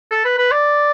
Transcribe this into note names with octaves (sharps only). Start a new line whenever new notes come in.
A4
B4
B4
D5